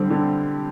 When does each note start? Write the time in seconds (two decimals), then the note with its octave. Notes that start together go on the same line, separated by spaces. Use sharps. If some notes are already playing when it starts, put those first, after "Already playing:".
Already playing: D3 G3 C4
0.10 D3